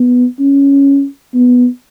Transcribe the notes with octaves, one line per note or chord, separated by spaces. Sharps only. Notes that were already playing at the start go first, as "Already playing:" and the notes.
Already playing: B3
C#4
B3